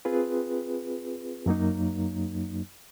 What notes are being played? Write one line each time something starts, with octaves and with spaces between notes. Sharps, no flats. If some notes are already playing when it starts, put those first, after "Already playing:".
C4 F4 G#4 B4
F#2 F#3 A#3 D#4